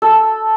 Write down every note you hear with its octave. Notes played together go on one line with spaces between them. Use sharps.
A4